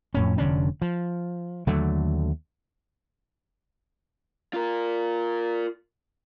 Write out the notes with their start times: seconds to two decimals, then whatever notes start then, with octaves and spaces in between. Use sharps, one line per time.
0.14 F2 A2 C#4
0.38 F1 D3 C#4 D4
0.82 F3
1.67 D#2 D3 F#3 A3
4.54 F4 A#4